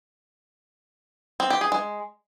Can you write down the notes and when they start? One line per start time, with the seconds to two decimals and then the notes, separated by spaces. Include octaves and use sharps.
1.40 C4
1.50 G4
1.61 G#4
1.72 G#3